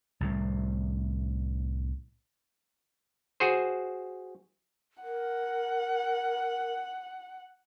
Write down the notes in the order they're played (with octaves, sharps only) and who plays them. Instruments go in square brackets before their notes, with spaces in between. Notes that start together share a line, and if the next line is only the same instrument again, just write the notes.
[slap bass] C2 A2 C3
[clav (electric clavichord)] F#4 G#4 C5
[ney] A#4 [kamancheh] F#5